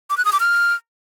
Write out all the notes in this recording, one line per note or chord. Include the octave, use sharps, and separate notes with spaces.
D6
F#6
D#6
D6
F6